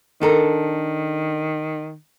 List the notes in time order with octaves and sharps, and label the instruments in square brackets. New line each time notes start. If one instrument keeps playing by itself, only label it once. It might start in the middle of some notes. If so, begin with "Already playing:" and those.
[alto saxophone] D#3 [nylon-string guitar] D4 A4 A#4